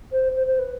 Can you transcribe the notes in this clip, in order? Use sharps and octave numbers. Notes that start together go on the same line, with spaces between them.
C5
C5
C5
B4